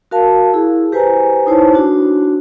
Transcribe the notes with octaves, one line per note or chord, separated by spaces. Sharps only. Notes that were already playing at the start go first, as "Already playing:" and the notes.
F#4 A#4 F5 A5
E4 G#4
G4 B4 C5 G#5 A#5
D#4 E4 C5 C#5 A5
D4 F#4